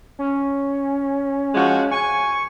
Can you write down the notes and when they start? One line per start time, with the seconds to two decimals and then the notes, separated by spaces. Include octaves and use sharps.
0.19 C#4
1.55 F3 G#3 F#4
1.91 G#5 C#6